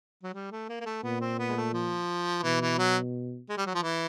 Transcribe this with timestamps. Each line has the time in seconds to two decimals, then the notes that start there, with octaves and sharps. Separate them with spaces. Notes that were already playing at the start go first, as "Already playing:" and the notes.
0.24 F#3
0.34 G3
0.51 A3
0.69 A#3
0.81 A#3
0.86 A3
1.04 A#2 B3
1.21 C4
1.39 B3
1.49 G#3
1.57 A3
1.74 F3
2.43 B2 E3
2.61 E3
2.78 F#3
3.49 G#3
3.58 G3
3.67 F#3
3.75 F3
3.82 E3